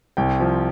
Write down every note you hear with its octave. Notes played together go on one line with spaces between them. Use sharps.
C2 G5
F3